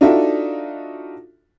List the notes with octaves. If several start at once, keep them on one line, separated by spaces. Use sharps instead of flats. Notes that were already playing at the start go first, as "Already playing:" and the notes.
D4 D#4 F4 F#4 A4 E5